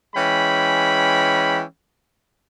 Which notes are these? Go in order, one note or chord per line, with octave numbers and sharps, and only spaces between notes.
E3 G#3 C#4 G5 B5